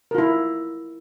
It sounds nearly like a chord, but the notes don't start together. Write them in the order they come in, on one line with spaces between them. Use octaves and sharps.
A#4 F4 E4